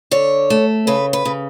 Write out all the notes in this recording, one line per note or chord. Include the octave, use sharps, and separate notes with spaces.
D3 C#5
A3
C#3 B4
B4
C#3